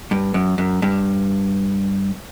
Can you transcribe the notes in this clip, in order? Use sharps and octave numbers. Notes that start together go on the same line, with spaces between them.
G2
F#2
F#2
G2